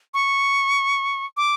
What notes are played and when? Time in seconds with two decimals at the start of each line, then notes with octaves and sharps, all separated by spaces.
0.14 C#6
1.37 D6